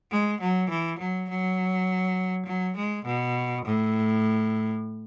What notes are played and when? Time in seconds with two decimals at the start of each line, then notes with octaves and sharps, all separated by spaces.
0.11 G#3
0.41 F#3
0.70 E3
0.99 F#3
1.29 F#3
2.46 F#3
2.76 G#3
3.05 B2
3.65 A2